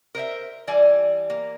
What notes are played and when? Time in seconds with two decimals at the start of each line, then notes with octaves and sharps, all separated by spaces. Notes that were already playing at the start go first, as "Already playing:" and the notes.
0.15 A#4 C5 D#5 E5
0.67 E3 G3 D5 G#5
1.30 A#3